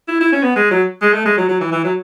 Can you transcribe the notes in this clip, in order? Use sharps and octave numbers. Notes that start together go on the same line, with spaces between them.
E4
E4
C#4
B3
G#3
F#3
G#3
A3
G#3
F#3
F#3
E3
E3
F#3